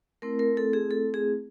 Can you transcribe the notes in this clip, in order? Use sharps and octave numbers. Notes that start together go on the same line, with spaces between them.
A3 C4 E4 A#4
A#4
A4
G#4
A4
G#4